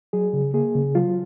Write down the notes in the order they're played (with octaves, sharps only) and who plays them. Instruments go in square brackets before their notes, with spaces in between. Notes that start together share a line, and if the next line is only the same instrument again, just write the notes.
[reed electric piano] F#3 G#4
C#3
A#3 G#4
C#3
F#3 F4